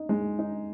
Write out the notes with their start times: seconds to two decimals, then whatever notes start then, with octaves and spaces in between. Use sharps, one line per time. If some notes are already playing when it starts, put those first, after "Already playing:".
Already playing: D#4
0.09 G#3
0.39 D#4